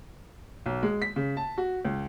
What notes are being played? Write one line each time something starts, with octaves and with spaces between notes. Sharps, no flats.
B1
G#3
B6
C#3
A5
F#4
C#2